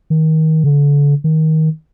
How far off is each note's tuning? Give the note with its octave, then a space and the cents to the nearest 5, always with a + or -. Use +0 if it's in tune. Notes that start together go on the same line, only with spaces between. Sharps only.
D#3 +25
D3 -35
D#3 +20